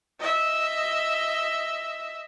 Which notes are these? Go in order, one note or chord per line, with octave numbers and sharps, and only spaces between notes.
D#5 E5